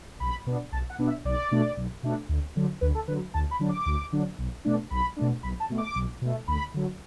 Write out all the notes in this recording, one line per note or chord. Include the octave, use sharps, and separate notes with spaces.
B1 B5
B2 B3 D4
B1 A5
F#5
B2 B3 D4
E5
B1 D5
B2 A3 D4
B1
B2 A3 D4
D2
D3 F#3
D2 B4
A4
D3 F#3 B4
D2 A5
B5
D3 F#3 D4
D6
D2
D3 F#3 D4
B1
B2 A3 D4
B1 B5
B2 A3 D4
B1 B5
A5
B2 A3
D6
B1
B2 A3
D2 B5
D3 F#3